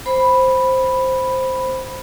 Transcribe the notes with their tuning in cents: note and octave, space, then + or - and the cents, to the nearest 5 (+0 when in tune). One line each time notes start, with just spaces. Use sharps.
C5 +0 B5 +0